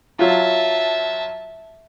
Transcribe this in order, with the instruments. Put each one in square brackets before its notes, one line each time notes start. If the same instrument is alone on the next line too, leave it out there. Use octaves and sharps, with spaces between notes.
[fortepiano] F#3 F4 [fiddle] E5 A5